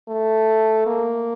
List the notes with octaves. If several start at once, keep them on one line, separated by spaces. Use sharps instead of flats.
A3
A#3